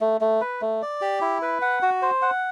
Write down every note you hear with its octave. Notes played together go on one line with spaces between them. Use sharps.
A3
A3
B4
A3
D5
G4
E4
B4
F#5
F#4
C5
F#5